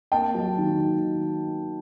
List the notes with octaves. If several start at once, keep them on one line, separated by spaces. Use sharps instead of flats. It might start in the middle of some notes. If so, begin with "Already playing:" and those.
A#3 G5 A5
F#3
D#3
D#3